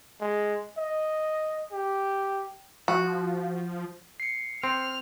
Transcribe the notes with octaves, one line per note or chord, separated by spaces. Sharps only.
G#3
D#5
G4
F3 F#4
C7 C#7
C4 F6